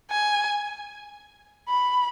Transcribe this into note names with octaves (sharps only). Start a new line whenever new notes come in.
G#5
B5